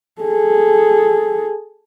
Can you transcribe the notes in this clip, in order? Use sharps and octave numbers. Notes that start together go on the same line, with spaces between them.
G#4 A4